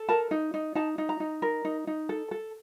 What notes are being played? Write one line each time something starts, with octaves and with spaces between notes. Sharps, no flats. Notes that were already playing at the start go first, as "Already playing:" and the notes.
Already playing: A4
A#4 A5
D#4
D#4
D#4 A5
D#4
A#5
D#4
A#4
D#4
D#4
A4
A4